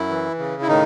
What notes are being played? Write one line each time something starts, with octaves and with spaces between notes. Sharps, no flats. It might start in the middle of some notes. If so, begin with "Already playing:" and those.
Already playing: F#2 E4
E3
C#3
E4
A2 D#3 D#4